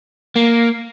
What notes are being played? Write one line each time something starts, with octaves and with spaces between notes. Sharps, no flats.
A#3